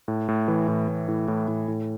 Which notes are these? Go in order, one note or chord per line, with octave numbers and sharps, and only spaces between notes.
A2
A2
E3
A2
A2
A2
A2
A2
A2